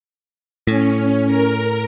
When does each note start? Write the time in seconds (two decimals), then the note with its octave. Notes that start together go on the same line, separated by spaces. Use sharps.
0.67 A2 C#4
1.26 A#4